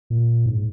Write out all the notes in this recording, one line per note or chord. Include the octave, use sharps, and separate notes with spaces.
A#2
G#2